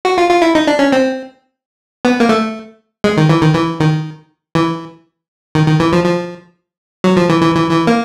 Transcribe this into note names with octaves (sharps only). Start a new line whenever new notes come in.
F#4
F4
F4
E4
D#4
D4
C#4
C4
B3
A#3
A3
G#3
D#3
E3
D#3
E3
D#3
E3
D#3
D#3
E3
F3
F3
F#3
F3
E3
E3
E3
E3
A#3